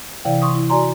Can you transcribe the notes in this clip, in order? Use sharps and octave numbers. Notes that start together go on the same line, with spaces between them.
C3 E3 E4 D5 F5 G5
C6 C#6 D#6
E4
F#4 D5 G#5 A#5 C6